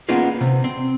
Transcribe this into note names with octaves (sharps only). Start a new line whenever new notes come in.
A#3 B3 C#4 D#4 F4 G#4
C3
C4